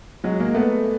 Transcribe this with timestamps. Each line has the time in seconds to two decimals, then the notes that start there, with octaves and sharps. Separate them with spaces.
0.24 F#3 G#3
0.40 G#3 A#3
0.55 A3 B3